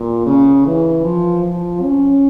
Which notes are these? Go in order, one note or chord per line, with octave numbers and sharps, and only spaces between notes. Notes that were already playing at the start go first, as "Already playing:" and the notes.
Already playing: A#2
C#3
E3
F3
F3
C#4